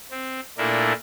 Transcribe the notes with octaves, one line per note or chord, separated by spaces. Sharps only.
C4
A#2 A3 D4 E4 A#4